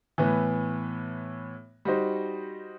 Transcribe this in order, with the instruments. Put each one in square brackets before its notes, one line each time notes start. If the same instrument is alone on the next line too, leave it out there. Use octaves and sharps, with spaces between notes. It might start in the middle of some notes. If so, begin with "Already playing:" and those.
[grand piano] A2 E3 B3
G3 D#4 F#4 C5